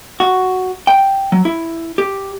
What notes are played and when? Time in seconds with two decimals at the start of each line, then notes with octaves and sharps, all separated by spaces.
0.20 F#4
0.87 G5
1.32 F#3
1.45 E4
1.98 G4